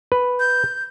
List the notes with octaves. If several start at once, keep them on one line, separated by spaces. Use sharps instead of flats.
B4
G6